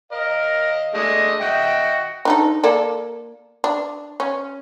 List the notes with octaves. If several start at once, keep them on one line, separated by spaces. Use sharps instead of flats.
A#4 D#5 F5
G#3 A3 D4 D#5
F#4 D#5 E5 G5
D4 D#4 A4
A#3 A4 D5
D4
C#4